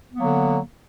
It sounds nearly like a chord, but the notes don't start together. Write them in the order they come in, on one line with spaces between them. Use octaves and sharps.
B3 A#3 F#3 D3